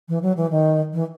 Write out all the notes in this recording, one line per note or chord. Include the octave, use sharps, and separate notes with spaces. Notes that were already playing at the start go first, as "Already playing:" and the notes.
E3
F#3
E3
D#3
E3